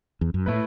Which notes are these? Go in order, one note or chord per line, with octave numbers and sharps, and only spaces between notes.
E2
F#2
A2 A3 E4 B4